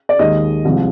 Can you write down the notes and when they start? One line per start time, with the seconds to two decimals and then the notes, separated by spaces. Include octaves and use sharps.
0.09 D5
0.19 D#2 D#3 G#3 D#5
0.65 C2 C3 F3 G#3